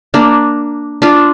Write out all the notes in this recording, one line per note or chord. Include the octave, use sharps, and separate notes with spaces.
A#3 D4
D4 F4